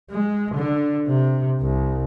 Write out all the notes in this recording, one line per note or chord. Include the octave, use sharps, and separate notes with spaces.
G#3
D3
C3
C2